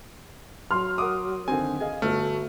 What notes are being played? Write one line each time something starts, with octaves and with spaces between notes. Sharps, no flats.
F#3 C6 F6
A#4 F#5 D6 D#6
D3 D#3 C4 G#5
G#4 D#5 F5
G1 A3 F#4 F6